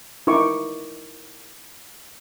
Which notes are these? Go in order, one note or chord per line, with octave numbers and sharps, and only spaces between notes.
D#4 E4 A#4 C#6 D6